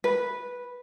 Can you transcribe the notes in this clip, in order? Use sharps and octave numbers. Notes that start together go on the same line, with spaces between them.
B4